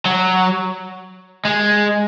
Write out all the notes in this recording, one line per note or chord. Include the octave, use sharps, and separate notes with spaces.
F#3
G#3